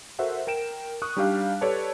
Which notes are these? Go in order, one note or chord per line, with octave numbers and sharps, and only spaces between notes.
F#4 A4 A#4 C5 E5 F#5
A#4 G5 D7 E7
C#6 D#6 F#6
G3 D4 D#4 G4 D5 F5
G4 A4 B4 C#5 D5 A5